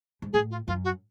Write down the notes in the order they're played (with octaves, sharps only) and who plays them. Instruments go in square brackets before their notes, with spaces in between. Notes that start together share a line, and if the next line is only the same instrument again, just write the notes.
[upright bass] G#2
[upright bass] A2 [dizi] G#4
[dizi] F4
[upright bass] F#2 [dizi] F4
[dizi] F#4